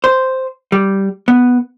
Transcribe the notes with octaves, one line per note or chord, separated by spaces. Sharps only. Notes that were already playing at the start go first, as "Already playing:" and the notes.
C5
G3
B3